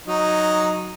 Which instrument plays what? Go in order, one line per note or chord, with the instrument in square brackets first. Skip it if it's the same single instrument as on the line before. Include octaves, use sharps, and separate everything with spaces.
[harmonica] F#3 D#4